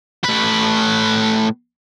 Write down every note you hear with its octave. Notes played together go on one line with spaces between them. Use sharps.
A2 B4